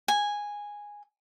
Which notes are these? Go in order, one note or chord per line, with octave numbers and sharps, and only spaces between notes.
G#5